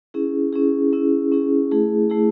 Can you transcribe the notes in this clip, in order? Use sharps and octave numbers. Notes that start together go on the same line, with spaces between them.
C#4 E4 G#4
C#4 E4 G#4
C#4 E4 G#4
C#4 E4 G#4
A3 E4 G#4
A3 E4 G#4